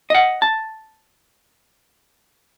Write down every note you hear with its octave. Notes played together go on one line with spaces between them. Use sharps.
D#5 F#5
A5